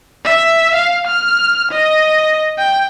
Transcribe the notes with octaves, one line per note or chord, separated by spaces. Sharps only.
E5
F5
F6
D#5
G5